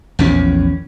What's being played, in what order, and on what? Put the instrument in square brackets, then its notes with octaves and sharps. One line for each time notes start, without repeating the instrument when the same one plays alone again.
[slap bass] A#1 E2 C#4